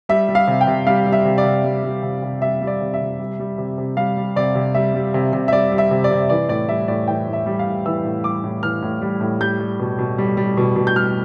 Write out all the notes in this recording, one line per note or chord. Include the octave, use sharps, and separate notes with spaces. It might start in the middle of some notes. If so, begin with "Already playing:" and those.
G3 E5
G3
F5
C3
G5
C3
G3 F5
G3
E5
C3
D5
C3
G3
G3
C3
C3
G3 E5
G3
D5
C3
E5
C3
G3
G3
C3
C3
G3 F5
G3
C3 D5
C3
G3 E5
G3
C3
C3
E5
G3 D5
G3
E5
C3
D5
C3
E3 D5
A2 D5
G3 E5
A2 D5
E3 G5
A2
E5
G3
F5
A2
E3 E6
A2
G3 D6
A2
E3 F6
A2
G3
A2
G3 G6
G3
B2
B2
G3
G3
B2
B2
G6
G3 F6